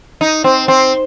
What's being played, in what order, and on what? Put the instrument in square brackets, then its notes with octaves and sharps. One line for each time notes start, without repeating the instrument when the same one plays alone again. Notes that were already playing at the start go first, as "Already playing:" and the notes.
[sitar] D#4
C4
C4